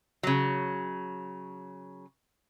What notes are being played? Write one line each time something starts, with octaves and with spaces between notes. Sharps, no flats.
C#3 F#3